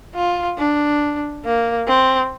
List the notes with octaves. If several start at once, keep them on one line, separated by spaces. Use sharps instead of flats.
F4
D4
A#3
C4